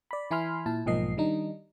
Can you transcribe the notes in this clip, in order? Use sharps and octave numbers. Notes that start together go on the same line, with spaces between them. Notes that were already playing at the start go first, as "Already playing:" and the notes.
D5 B5
E3 E4 G#5 B5 C6 F6
A#2 E4 A5
B1 G#2 F3 A#3 D#5 C7
D#3 G3 D4 D#4